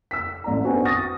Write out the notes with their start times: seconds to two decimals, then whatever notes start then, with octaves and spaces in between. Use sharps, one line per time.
0.11 E6 B6
0.44 A1 D5 A#5
0.64 B3 C4 D4 F#4 F#5 G#5
0.85 C#6 D#6 F6 A6 A#6